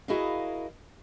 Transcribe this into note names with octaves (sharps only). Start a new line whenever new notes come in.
E4 F#4 G#4 A#4 D#5 F5